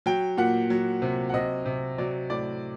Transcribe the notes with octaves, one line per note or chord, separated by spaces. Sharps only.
F#3 G5
A#2 F#5
F#3
C3
F#5
C3 D#5
C3
F#3 D5
A2 D5